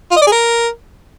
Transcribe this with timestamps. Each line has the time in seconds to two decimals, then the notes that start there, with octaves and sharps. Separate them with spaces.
0.11 F4
0.16 D#5
0.22 D5
0.27 G#4
0.32 A#4